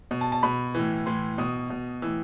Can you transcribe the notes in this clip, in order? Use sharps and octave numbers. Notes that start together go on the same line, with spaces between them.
B2
A5
A5
B2 B5
A2 E3
A2 E3 C6
B2 D#6
B2
A2 E3 E6